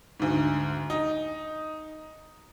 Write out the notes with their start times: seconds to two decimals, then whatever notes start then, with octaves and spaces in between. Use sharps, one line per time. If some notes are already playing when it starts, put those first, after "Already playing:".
0.20 D2 G#2
0.90 D#4